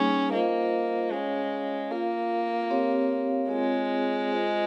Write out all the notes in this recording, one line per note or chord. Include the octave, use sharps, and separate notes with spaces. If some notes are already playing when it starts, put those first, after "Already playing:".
Already playing: G3 A#3 C#4 D#4 G#4
A#3 F4 C5 D#5
G#3 C#4 G#4 C#5 F5
A#3 F4 A#4 F5
C4 G4 C#5 F5
G#3 C4 F4 G#4 C#5
F4 G#4 C5 D#5